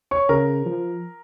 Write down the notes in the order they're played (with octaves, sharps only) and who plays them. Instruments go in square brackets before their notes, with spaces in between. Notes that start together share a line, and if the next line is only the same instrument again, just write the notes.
[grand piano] C#5 C#6
[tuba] C#3 [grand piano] A#4 A#5
[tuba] F3